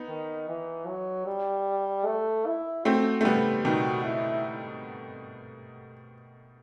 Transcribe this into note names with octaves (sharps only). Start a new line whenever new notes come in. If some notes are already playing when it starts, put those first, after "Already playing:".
Already playing: B3 D#4
D#3
E3
F#3
G3
A3
E4
A3 C4 F#4
A3
G3 B3 G4
B2 D#3 F#4
E4